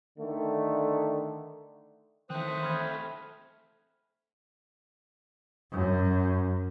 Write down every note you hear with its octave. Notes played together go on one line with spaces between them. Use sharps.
D3 D#3 A3
D#3 E3 A3 C4 C5 D#6 F#6
B5 F6 G#6
F#2